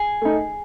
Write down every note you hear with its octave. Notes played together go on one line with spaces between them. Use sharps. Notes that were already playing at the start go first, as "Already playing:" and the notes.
Already playing: G#4
A3 D#4